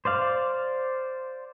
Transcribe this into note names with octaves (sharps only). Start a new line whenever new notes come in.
C5 D5 F5